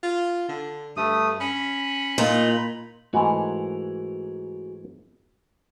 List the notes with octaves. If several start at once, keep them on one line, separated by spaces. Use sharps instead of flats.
F4
D3
G2 A3 D#6
C#4 B5
A#2 D#4 F4
G#2 E3 A3 F#4 G#4 A#4